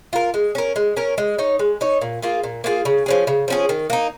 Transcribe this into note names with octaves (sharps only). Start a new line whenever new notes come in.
F4 A#4
G#3
C#4 A#4
G#3
C#4 A#4
G#3
D#4 C#5
G#3
D#4 C#5
A#2
A#3 F4 G#4
A#2
A#3 F4 G#4
C#3
F3 C#4 G#4
C#3
F3 C#4 G#4
D#3
A#3 D#4